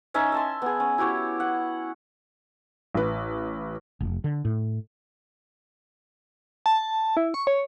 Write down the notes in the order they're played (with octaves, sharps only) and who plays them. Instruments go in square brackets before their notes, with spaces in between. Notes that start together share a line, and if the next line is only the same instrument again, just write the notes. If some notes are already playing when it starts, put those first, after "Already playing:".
[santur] C#4 D#4 D#5 E5
E5 A5 C6
B3 G#4
C#4
E4 F#4 G4 C#5
F#5
[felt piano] A1 B4
[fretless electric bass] F1
D3
A2
[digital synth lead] A5
E4
C#6
C#5